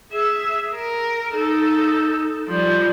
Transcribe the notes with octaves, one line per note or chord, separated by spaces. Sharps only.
G#4 E5
A#4
D#4 A4
F3 G3